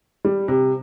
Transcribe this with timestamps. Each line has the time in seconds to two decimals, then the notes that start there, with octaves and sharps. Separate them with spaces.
0.25 G3
0.48 C3